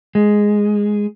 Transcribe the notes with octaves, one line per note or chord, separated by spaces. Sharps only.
G#3